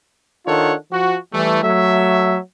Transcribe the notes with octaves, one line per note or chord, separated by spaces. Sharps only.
D#3 D4 F4 A4 C#5 F#5
F3 F#4
E3 G3 A3
F#3 A3 E5